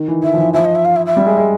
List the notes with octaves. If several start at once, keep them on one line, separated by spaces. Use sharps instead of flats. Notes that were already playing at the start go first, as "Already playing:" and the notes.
Already playing: D#3
E3
E3 E5
F3
E3
F3 E5
D#5
E5
F5
E5
E5
G3
G#3
G#3